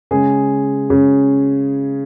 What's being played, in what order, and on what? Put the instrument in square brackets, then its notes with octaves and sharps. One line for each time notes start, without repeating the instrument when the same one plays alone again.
[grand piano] C#3 G#3 G#4
C#3